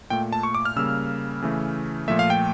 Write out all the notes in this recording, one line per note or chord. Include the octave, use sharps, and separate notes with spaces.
A#2 A3 G5
A5
C#6
D6
F6
C#3 G3 A#3 E6
C#3 E3 A3
A#2 F3 A3 E5
F5
G5